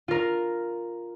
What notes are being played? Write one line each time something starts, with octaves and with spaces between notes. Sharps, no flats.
F4 A#4